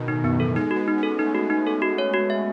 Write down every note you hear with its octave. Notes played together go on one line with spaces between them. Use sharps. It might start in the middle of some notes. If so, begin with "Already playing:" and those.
Already playing: B2 D#3
A2 D#4
F#2 B3
E3 A4
G#3 D#4
F#4
B3
D#4
C#4
A4
A3 D#4
B3 F#4
B3 D#4
C#4 A4
F#4
C#5
F#4
E5